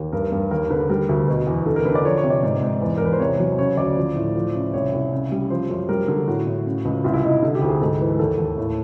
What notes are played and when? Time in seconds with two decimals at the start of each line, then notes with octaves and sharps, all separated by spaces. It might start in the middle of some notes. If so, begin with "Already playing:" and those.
Already playing: D#2
0.12 G2 A#4
0.32 G2
0.51 D#2 A#4
0.70 D3 B4
0.89 G3 A#4
1.09 D2
1.28 B2
1.47 E2
1.66 D3 A4
1.76 A#4
1.85 D3 B4
1.95 D5
2.05 F3 C#5
2.17 C#5
2.24 C3
2.30 D5
2.43 G#2
2.63 G#2
2.81 E2
2.98 A#4
3.01 E2 B4
3.13 C5
3.20 C3 C#5
3.39 F#3
3.58 C#3 C#5
3.77 D2 D5
3.97 F3
4.16 A2
4.36 F3
4.55 C#3
4.73 C2 C#5
4.93 C2
5.12 C#3
5.31 G3
5.50 F3 C5
5.70 F#2
5.89 G3 A#4
6.08 D3
6.28 A2 F#4
6.47 A2
6.66 C#3
6.85 C#2
7.04 C2 F4
7.14 E4
7.23 C2 D#4
7.34 E4
7.43 D3
7.55 G4
7.62 D2
7.68 G#4
7.81 G#2 A4
8.00 E3
8.19 D#2 A4
8.39 D#2
8.58 A2